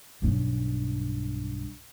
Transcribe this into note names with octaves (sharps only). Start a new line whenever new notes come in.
B1 G2